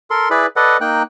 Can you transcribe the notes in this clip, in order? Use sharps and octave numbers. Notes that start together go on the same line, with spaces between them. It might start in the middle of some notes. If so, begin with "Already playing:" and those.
A4 A#4 C6
E4 G#4 B4 D5 B5
A4 B4 D5 D#5 F#5
A#3 D#4 G5 F#6